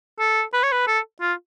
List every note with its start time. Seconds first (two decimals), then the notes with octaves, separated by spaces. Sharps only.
0.19 A4
0.53 B4
0.63 C#5
0.72 B4
0.87 A4
1.21 F4